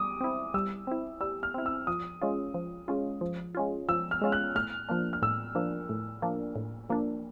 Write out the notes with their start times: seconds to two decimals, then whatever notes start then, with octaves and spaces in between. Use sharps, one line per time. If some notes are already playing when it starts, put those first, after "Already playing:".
Already playing: G3 D6 D#6
0.21 C4 E4
0.54 G3 E6
0.87 C4 E4
1.21 G3 E6
1.43 F6
1.54 C4 E4
1.66 E6
1.87 F3 D#6
2.22 G#3 C#4 F4
2.54 F3
2.88 G#3 C#4 F4
3.21 F3
3.55 G#3 C#4 F4
3.89 F3 E6
4.11 F6
4.21 G#3 C#4 F4
4.32 F#6
4.55 A2 F6
4.89 F3 A#3 D4
5.13 F6
5.22 A2 E6
5.55 F3 A#3 D4
5.89 A2
6.22 F3 A#3 D4
6.56 A2
6.89 F3 A#3 D4